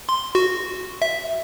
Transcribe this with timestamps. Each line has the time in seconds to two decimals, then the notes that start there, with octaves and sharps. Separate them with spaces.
0.09 C6
0.35 F#4
1.02 E5